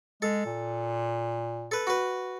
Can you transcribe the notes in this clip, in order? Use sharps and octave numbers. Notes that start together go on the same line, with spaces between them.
G#3 A4
A#2
A4 B4
F#4 B4